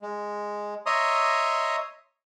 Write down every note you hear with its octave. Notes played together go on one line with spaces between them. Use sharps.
G#3
C#5 D#5 E5 A#5 C6 D#6